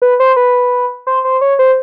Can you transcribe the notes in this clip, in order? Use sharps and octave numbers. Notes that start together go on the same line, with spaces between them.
B4
C5
B4
C5
C5
C#5
C5